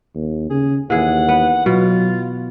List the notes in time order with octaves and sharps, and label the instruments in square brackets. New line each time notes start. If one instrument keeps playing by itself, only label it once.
[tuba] D#2
[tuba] C#3 [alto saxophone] G#4
[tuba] D#2 [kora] E3 G#4 [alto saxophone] F#5
[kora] B3
[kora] B2 [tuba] F#3 [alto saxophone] F4